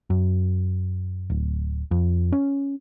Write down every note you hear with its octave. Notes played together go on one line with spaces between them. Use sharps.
F#2
D1
F2
C#4